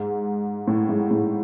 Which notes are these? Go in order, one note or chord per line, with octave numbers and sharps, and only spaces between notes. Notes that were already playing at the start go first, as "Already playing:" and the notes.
Already playing: G#2
A2
G#2
A2